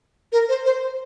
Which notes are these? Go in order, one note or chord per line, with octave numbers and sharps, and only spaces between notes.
A#4
C5
C5